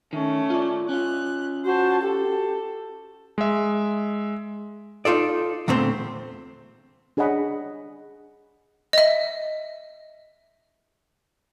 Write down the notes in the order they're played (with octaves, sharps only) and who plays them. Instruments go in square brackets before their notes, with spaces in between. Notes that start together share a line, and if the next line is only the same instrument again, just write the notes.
[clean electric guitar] D#3 [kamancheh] A3 C#4
[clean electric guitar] F4 D5
[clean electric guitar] C#4 F4 [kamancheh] F#6
[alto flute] F#4 [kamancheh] C5 A5
[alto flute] G4 [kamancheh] A4
[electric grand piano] G#3 E5
[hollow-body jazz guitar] D#4 F4 A4 D5
E2 A#2 D3 A3 C4 C5
[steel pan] D4 G#4 C#5 D#5 F#5 B5
[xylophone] D#5 E5